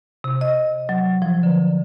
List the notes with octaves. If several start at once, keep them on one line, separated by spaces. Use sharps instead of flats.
C3
D#5
F#3
F3
D3